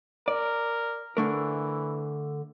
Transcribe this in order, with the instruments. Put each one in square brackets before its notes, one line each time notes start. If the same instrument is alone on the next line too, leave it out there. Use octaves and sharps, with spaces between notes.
[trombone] A#4 [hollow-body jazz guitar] D5
[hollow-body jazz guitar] D3 A3 A#4 [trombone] E3